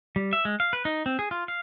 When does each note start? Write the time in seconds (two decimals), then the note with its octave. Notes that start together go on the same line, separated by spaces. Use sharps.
0.16 G3
0.33 E5
0.45 G#3
0.60 F5
0.73 B4
0.85 D#4
1.06 C4
1.19 G#4
1.31 F4
1.48 F5